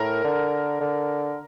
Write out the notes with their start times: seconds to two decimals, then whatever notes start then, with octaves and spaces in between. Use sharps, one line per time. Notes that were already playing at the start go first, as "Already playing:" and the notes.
Already playing: A2 A#4
0.24 D3
0.80 D3